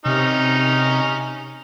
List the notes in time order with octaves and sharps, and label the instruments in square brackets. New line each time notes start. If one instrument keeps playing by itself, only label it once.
[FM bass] C3 [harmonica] C#4 D#4 F6